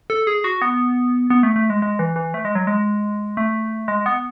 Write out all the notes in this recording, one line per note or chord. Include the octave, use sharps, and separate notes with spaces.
A4
G#4
F#4
B3
B3
A3
A3
G#3
G#3
E3
E3
A3
G#3
F#3
G#3
A3
G#3
B3